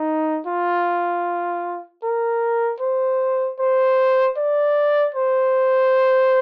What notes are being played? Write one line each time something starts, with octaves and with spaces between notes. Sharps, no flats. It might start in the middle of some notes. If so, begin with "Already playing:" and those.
Already playing: D#4
F4
A#4
C5
C5
D5
C5